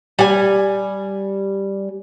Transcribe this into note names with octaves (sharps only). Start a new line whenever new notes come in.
G3 G#5